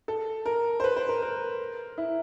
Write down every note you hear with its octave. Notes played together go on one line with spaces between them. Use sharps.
A4
A#4
C5
B4
C5
A#4
A#4
E4